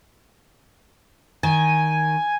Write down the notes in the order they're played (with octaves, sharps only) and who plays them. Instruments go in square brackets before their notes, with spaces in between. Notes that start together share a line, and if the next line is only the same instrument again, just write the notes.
[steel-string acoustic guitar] D#3 [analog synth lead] G#5